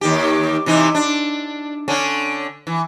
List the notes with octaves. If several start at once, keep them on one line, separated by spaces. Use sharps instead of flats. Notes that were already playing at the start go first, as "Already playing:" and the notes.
D#2 D#3 G4
C3 E3 D#4
D4
D3 C#4
E3